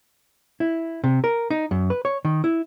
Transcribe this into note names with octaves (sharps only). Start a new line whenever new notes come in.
E4
C3
A#4
D#4
F#2
B4
C#5
D#3
E4